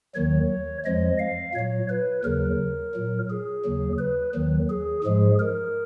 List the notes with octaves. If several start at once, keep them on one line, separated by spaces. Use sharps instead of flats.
D#2 D#3 F#3 C#5
F2 F3 G#3 D#5
F5
A#2 F#3 C#5
B4
D#2 C#3 F#3 A#4
A#2 F#3
G#4
D#2 C#3 F#3
B4
D#2 D#3 F#3
G#4
G#2 F3 G#3 G#4
A#4